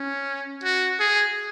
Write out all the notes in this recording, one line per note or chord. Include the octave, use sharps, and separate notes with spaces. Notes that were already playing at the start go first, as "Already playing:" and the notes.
Already playing: C#4
F#4
G#4